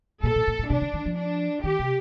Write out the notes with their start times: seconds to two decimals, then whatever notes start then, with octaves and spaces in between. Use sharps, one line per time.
0.23 A#2 A4
0.36 A#2
0.47 A2
0.59 A2
0.70 C3 D4
0.82 D3
0.93 D#3
1.06 F3
1.17 D4
1.64 D#3 G4
1.79 C3